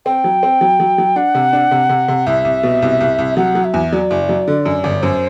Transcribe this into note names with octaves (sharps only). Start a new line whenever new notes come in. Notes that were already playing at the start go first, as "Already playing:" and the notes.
C4 G5
F#3
C4
F#3
F#3
F#3
D4 F#5
C3
D4
C3
C3
C3
C2 E5
C2
B2
C2
C2
C2
F#3 F#5
F#3
E5
E2
F#3 D5
F#1
F#3
D3
F#2
G1
F#2 C5